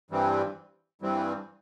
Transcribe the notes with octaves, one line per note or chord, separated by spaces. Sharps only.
G2 E3 G3 C4
G2 E3 G3 C4